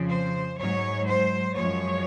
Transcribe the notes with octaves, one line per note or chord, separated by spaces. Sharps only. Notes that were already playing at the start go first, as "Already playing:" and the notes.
Already playing: F2 C#3 F3
C5
G#2 F#3 C#5
C5
F#2 F3 G#3 C#5